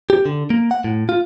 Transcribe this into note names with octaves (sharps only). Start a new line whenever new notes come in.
G4
D3
A#3
F#5
A2
F4